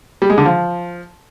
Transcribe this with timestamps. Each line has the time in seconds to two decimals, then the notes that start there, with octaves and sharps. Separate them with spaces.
0.22 G3
0.30 G#3
0.38 D3
0.46 F3